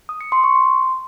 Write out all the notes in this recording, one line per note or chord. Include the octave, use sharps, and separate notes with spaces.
D#6
C#7
C6
C#6
C6